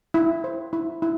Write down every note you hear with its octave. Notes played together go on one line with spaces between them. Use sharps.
E4
C5
E4
E4